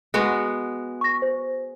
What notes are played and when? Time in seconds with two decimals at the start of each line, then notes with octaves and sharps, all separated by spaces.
0.14 G#3 B3 F#4
1.01 C#6 A#6
1.22 C5